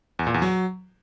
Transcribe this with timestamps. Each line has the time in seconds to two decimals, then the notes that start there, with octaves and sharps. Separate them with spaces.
0.19 E2
0.27 A#2
0.34 E2
0.42 F#3